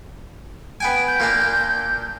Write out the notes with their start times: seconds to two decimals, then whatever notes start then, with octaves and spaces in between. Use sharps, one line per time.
0.80 B3 G5 G#5 D7
1.07 G6
1.20 A#2 A#3 D4